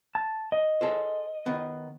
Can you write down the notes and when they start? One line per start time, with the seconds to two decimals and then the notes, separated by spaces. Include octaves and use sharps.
0.15 A5
0.52 D#5
0.81 G#4 A4 C5
1.46 D#3 B3